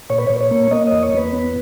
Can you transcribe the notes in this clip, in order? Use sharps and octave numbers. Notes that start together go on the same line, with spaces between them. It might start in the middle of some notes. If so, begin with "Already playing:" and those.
A#2 C#5
B4
A#2 C#5
C#5
A#3
A#3 D#5
D#5
E2
C#5
E2 B4
B3